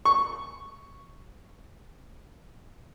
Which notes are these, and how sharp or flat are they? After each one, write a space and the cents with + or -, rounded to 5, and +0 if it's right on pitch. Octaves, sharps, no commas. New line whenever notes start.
C#6 +0